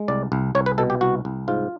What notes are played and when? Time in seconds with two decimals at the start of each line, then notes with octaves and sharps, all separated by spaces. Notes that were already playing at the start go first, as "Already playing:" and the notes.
Already playing: G#3
0.08 C2 D5
0.32 C2
0.55 C2 C#5
0.66 B4
0.78 B2 A4
0.90 G4
1.01 C2 F#4
1.25 C2
1.48 G#2 F4